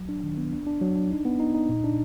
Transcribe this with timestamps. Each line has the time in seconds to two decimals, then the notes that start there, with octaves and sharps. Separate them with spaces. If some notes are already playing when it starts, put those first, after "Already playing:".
Already playing: F#3
0.09 D4
0.24 D#3
0.37 B3
0.52 D4
0.67 D4
0.81 F#3
0.96 D4
1.11 D#4
1.25 B3
1.40 D#4
1.55 D#4
1.69 A#2
1.84 D4